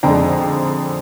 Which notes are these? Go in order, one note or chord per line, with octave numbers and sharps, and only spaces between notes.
F2 D3 G#3 D4 G5 A#5